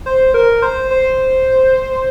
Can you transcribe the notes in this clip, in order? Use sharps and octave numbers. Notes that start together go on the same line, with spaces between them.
C5
A#4
C5
C5